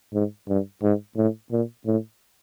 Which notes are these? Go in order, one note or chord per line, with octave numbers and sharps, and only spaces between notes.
G#2
G2
G#2
A2
A#2
A2